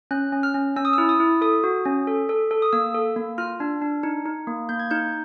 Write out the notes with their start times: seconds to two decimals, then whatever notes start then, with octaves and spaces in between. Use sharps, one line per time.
0.11 C#4 F#6
0.32 C#4
0.43 F6
0.54 C#4
0.76 C#4 E6
0.85 D#6
0.93 E4 E6
1.09 D#6
1.20 E4
1.41 A4 D#6
1.64 F#4
1.85 C#4
2.07 A4
2.29 A4
2.51 A4
2.62 D#6
2.73 A#3 E6
2.94 A4
3.16 A#3
3.38 F4 F6
3.60 D4
3.82 D4
4.03 D#4
4.26 D#4
4.47 A#3
4.69 A#3 G6
4.79 G#6
4.91 D#4 G6